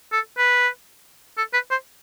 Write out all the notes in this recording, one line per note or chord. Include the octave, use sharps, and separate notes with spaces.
A4
B4
A4
B4
C5